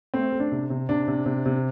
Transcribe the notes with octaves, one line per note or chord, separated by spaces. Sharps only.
A3 C4
A3
D4
C3
C3
C3 D4
C3
C3
C3